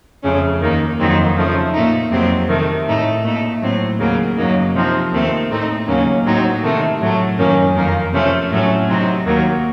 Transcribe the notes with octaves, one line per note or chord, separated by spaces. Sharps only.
F2 C#3 A3 C#4
D#2 D#3 A#3 D#4
F2 D#3 F#3 C4 D#4
C#3 F3 A3
A#2 A3 D#4
F2 C3 F#3 C4
C3 D#3 A3
A2 A3 D#4
A#2 A3 D#4
A2 F#3 C4
D#2 C#3 F#3 A#3
F#2 C#3 F#3 A#3 D#4
C3 F3 C4 D#4
D#2 D#3 A3 C4
A2 A3 C4 D#4
D#2 C#3 F#3 A#3 C#4
A2 F#3 C4 D#4
C3 D#3 A3
A2 F#3 A3
F#2 D#3 A#3 C#4
F2 D#3 A#3
C3 F3 A3 C#4
A2 F#3 A3 C#4
C3 F#3 C4 D#4
D#2 D#3 F#3 A#3